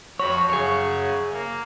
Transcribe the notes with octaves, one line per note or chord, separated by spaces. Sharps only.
F2 F#4 C#5 B5
F#2 C#3 G#4 C#5
A#3